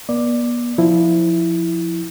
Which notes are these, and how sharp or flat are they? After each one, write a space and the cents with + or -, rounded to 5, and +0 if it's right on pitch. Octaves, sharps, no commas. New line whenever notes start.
B3 -40 D5 +5
F3 +0 E4 +0